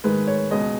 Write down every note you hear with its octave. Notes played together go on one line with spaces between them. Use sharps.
G#2 D#3 G#3 B4
C#5
C#2 B2 G#3 D#5